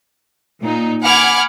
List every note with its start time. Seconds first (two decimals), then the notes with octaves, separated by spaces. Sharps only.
0.61 A#2 D#4
1.03 F#5 G#5 B5 D6 F6 G#6